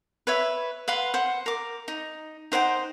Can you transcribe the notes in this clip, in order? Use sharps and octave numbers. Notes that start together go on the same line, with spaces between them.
B4 C#5 E5
B4 F5 F#5 C6
C5 F#5
A#4 D6
D#4
D#4 C5 F#5 G5